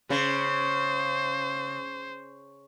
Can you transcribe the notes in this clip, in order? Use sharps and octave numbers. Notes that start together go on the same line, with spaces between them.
C#3 C5